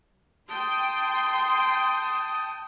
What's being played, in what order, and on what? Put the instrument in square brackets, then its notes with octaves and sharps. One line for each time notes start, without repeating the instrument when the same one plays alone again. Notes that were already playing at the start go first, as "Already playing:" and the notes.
[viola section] G5 [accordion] A5 D#6 [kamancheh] C6